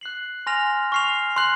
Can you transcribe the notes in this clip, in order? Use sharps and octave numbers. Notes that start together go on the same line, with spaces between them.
F#6 C7 F#7
G#5 C6 F6 A#6 F7
C#6 F6 C7 F7
C6 F#6 C7 F#7